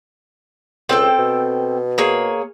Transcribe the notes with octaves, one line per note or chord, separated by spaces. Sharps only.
C#2 C4 A4 G5
B2
A#3 G#4 C#5